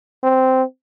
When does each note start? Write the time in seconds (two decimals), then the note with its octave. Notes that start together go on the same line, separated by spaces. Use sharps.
0.23 C4